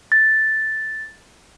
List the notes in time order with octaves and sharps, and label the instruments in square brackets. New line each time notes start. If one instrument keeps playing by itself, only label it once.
[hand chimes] A6